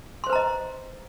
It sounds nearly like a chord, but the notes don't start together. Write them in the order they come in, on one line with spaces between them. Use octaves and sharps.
C6 C5 B4 A#5 D#5